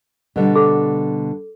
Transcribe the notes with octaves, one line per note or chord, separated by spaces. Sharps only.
B2 D3 G3
A4